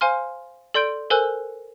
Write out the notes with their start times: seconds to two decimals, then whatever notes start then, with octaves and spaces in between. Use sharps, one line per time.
0.01 C5 F5 G#5 C6 F6
0.74 A4 D5 C6 G6 D7
1.10 A4 A#4 C5 G#5 E6 F#6